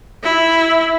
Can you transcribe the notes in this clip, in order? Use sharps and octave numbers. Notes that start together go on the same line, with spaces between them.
E4